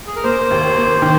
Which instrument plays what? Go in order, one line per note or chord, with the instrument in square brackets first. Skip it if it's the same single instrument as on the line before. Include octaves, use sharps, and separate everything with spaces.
[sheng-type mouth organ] G#4
A#4
[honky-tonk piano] A#3 [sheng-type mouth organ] C5
[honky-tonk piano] D#2
A#3
D#3